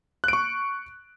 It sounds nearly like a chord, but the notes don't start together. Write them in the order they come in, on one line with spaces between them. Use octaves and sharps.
F#6 D7 C#6